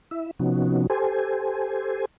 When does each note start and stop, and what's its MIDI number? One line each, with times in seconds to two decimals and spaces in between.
0.11 0.31 64
0.11 0.31 76
0.39 0.87 48
0.39 0.87 53
0.39 0.87 59
0.39 0.87 61
0.39 0.87 63
0.39 0.87 66
0.90 2.05 67
0.90 2.05 69
0.90 2.05 72
0.90 2.05 80